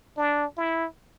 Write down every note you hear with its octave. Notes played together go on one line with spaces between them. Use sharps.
D4
E4